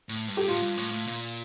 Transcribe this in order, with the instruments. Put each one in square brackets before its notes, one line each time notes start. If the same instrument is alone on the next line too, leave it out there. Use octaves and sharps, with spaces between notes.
[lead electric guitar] A2
G2
[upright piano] G4
[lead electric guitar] A2 [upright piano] F4
[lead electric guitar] G2
A2
A2
A#2